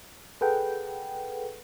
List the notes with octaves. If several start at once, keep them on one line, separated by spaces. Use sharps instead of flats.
G#4 A4 B4 F#5 G5